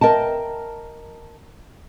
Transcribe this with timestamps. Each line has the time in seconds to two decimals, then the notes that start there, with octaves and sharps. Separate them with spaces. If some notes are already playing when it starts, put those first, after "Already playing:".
0.01 A#4 D#5 G5 A5